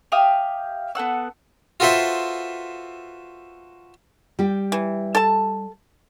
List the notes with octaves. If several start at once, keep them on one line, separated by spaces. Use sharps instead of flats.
G4 E5 F5 D#6
B3 A4 F#5 E6
F4 F#4 A4 B4 C5 E5
G3 G4
E3
A4 A5